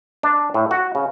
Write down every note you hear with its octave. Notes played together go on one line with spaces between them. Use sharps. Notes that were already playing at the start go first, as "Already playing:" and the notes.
D4
A2
F#4
C#3